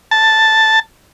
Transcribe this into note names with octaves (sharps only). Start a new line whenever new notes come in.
A5